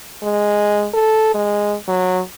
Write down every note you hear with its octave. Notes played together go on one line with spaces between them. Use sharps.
G#3
A4
G#3
F#3